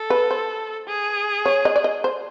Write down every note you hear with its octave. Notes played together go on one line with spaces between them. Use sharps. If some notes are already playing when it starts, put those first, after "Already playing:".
Already playing: A4
B4
C5
G#4
C#5
D#5
D5
D#5
C5